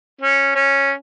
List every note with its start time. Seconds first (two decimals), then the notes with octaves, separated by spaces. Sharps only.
0.21 C#4
0.55 C#4